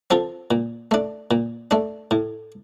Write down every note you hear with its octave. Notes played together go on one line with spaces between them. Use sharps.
F3 C4 F4 A4
A#2
A3 D4
A#2
A3 D4
A2